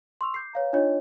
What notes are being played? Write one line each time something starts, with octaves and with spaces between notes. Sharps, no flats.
C6 C#6 E6 F7
D6 G6 C7
B4 C#5 F5 A#5
D4 D#4 F4 C#5 D#5